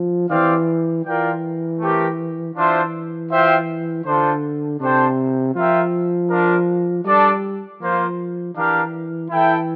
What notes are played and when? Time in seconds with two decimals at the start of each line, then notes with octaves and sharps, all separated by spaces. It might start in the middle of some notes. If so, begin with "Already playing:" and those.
Already playing: F3
0.29 E3 C4 G4 D5 F5
1.04 E3 F4 A#4 D5 G5
1.79 A3 C4 G4 A#4
2.55 E3 D4 F4 C5 E5
3.30 F4 C5 E5 G5
4.05 D3 D4 F4 A4 C5
4.80 C3 D4 A4 C5 G5
5.55 F3 F4 A#4 E5 G5
6.30 D4 F4 A#4
7.05 G3 D4 A4 D5
7.81 F3 A#3 F4 C5
8.55 E3 D4 G4 A#4 F5
9.30 E3 E4 A4 E5 G5